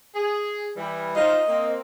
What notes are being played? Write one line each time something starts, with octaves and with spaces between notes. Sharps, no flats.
G#4
E3 G3
D#4 F4 C5 D#5
A#3 C4